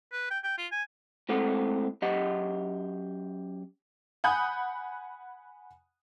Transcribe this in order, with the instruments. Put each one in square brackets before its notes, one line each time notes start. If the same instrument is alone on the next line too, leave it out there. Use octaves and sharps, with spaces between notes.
[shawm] B4
G5
G5
F4
G#5
[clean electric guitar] A2 G#3 C4 A4 F#5
F#2 G4 D#5 F#5
[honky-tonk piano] F#5 G#5 B5 D#6 F#6 G6